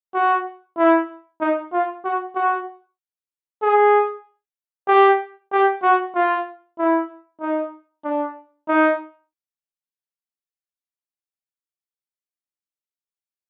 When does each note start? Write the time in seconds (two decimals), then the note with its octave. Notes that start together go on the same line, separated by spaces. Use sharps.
0.14 F#4
0.78 E4
1.41 D#4
1.73 F4
2.05 F#4
2.35 F#4
3.62 G#4
4.88 G4
5.52 G4
5.83 F#4
6.15 F4
6.79 E4
7.41 D#4
8.04 D4
8.68 D#4